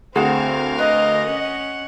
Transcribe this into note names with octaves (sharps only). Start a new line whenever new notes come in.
D2 C4 G#4 A#4 D#5 F5 F#5 E7
B4 D#5
C#4 F#5